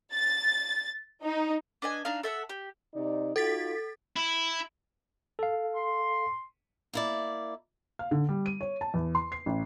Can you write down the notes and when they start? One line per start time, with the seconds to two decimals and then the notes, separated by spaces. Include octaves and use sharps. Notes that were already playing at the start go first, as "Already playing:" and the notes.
0.13 A6
1.22 D#4
1.82 D4 B4 D#5 G#5
2.05 D4 D#4 F5
2.23 A4 E5 F#5
2.49 G4
2.94 C3 D#4 D5
3.36 D#4 F4 F#4 A4 A6 B6
4.16 E4
5.39 A4 F5
5.75 C6
6.93 A#3 E4 D5
7.99 F5
8.11 D3
8.29 G3
8.46 D#7
8.61 C#5
8.81 A5
8.94 E2
9.15 C6
9.32 C7
9.46 A1